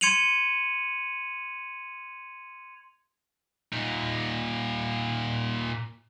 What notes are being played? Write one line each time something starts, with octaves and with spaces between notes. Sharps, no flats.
C6 G#6 C#7 D#7 F7 F#7
A#2 D#4